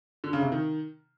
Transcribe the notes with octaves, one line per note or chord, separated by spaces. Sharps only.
D3
C#3
C3
D#3